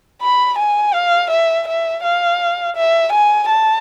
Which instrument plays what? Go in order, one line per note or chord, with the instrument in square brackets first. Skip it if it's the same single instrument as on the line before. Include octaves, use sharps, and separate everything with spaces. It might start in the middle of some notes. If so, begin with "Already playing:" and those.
[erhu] B5
G#5
F5
E5
E5
F5
E5
G#5
A5